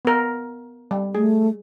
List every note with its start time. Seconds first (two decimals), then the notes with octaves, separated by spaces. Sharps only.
0.05 B3 A#4
0.91 G3
1.15 A3 G#4